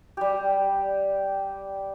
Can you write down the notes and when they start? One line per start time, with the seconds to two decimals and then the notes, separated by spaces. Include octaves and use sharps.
0.17 G3 G4